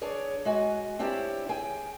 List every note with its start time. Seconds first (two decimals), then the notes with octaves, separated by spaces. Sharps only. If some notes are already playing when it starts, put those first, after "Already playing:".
0.01 D4 G#4 C#5 D5
0.45 G#3 F#4 G#5
0.99 C4 D4 E4 G4 C#5
1.49 G#4 G5 G#5